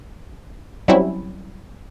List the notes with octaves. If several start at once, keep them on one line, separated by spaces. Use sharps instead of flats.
F#3 G3 C4 C#4 E4